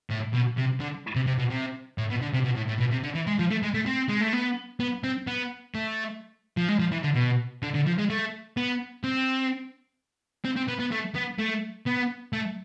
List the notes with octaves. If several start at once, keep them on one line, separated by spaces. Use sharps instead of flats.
A2
B2
C3
D3
C3
C3
B2
C3
A2
B2
D3
C3
B2
A2
A2
B2
C3
D3
E3
G#3
F3
A3
G#3
A3
C4
G#3
A3
B3
B3
C4
B3
A3
F3
G#3
F3
E3
D3
B2
D3
D3
F3
G#3
A3
B3
C4
C4
C4
B3
B3
A3
B3
A3
B3
A3